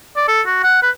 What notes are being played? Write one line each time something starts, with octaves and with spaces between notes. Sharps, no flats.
D5
A4
F#4
F#5
B4